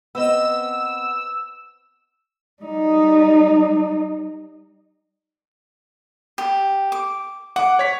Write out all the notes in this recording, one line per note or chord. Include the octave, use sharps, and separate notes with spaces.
B3 C4 D#5 E6
G3 D#4
G4
D6
F#5 D6
C#5 B6